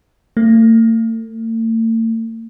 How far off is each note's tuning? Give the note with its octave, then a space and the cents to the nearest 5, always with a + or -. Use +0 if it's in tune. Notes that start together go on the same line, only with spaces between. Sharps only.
A3 +45